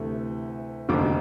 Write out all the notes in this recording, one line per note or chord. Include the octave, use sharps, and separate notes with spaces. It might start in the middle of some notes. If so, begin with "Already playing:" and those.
Already playing: D2 C3 E3 A3
F1 D#2 D3 F3 D6